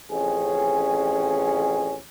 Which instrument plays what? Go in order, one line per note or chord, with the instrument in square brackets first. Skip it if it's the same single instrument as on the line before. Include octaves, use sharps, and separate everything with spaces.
[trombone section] A1 F2 C#4 G#4